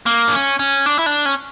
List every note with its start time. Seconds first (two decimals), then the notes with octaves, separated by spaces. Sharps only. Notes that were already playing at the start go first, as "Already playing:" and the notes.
0.06 A#3
0.28 D4
0.32 C#4
0.59 C#4
0.86 D4
0.99 E4
1.06 D4
1.26 C#4